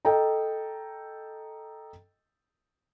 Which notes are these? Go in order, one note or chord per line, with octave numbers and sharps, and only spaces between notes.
A4 D#5 G5 A#5